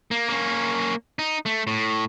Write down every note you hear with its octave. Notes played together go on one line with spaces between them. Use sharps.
A#3
A#3 C#4
D#4
A3
A2